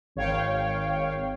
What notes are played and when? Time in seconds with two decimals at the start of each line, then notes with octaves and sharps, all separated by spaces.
0.16 G#1 C#5 F5 G5